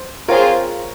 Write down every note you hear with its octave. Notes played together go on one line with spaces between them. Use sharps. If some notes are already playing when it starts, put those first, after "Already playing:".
Already playing: C5
C4 F4 G#4 A#4 C5 C#5